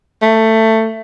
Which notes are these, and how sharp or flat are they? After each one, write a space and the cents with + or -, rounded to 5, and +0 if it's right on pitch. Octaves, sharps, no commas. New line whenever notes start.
A3 +15